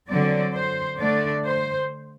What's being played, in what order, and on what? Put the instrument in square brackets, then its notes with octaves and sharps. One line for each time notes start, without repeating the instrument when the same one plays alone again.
[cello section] D3 F#3 C4 D5
C5
D3 A3 D4 D5
C5